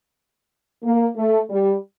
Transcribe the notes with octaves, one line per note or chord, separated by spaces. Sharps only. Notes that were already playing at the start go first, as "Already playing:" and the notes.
A#3
A3
G3